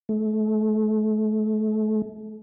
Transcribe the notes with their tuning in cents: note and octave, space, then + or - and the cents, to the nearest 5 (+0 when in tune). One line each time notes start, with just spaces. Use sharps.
A3 -35